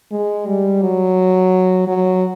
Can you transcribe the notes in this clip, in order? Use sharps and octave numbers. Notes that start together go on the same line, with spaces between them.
G#3
G3
F#3
F#3